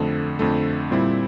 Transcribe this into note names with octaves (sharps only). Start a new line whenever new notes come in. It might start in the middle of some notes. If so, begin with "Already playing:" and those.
Already playing: F2 D3 A3
F2 D3 A3
A#2 G3 C4 E4